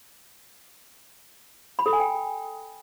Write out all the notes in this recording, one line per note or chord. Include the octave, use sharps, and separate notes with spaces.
B5
A4
G#5
G5